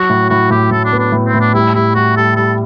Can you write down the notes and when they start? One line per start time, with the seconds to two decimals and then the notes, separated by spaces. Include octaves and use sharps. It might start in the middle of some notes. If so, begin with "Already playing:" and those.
Already playing: F#3 F#4
0.10 A2
0.30 A2 F#4
0.50 A2 G4
0.71 A2 A4
0.85 D4
0.92 B3
0.99 D4
1.12 A2
1.27 C4
1.34 A2
1.41 D4
1.54 G3 E4
1.75 G3 E4
1.95 G3 F#4
2.16 G3 A4
2.36 G3 A4